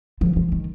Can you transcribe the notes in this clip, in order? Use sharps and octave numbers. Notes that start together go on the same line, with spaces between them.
F3
F3
D#3